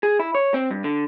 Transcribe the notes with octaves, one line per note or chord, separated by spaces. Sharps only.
G#4
E4
C#5
C4
G2
D3